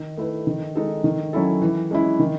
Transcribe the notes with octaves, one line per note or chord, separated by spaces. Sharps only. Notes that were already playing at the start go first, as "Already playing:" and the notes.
Already playing: D#3
A3 E4 B4
D#3
G#3 D#4 A4
D#3
F#3 C#4 E4 A4
E3
G#3 C#4 E4
D#3